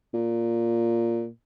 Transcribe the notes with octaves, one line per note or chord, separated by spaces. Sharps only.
A#2